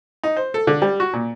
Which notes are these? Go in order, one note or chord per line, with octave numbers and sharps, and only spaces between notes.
D#4
C5
A4
D3
G3
F#4
A#2